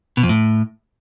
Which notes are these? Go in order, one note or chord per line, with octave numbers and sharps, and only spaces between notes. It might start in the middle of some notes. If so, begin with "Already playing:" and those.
B2
F2
A2